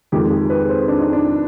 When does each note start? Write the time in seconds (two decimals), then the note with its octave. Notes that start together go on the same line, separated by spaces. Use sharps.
0.12 F2 D#3 G#3 G4
0.31 G#4
0.50 B4
0.69 C5
0.88 D4
1.01 D#4
1.13 D4